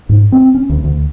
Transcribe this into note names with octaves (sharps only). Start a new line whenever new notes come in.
G#2
C4
C#4
D2
D2